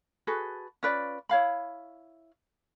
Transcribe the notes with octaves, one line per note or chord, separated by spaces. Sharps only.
F#4 G#4 A4 B4
C#4 F4 B4 D5
E4 C#5 F5 B5